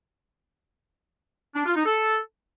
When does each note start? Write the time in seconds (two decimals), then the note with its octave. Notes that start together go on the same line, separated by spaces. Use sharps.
1.55 D4
1.65 F4
1.75 D#4
1.86 A4